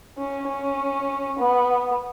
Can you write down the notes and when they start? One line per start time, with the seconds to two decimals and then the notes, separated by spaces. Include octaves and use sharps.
0.18 C#4
0.48 C#4
1.39 B3